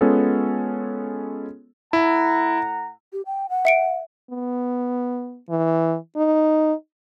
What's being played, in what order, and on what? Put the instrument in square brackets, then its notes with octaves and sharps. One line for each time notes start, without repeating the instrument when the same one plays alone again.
[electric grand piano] G#3 B3 C#4 F4 G#4 A4
[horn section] A2 F#5 A#5 [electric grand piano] E4
[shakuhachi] G4
G5
F#5
[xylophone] E5 C#7 D7
[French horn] B3
E3
D#4